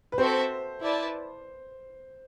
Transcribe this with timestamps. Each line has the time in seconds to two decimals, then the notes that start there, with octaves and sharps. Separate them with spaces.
0.12 B4
0.18 C4 F#4 A4 C5 E5
0.81 E4 B4 D5 A5